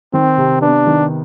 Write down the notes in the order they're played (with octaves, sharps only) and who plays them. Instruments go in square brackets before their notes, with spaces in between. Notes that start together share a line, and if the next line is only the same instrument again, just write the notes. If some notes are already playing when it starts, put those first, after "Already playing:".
[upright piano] D#3 [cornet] C4
[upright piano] C3
[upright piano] B3 [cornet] D4
[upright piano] D#3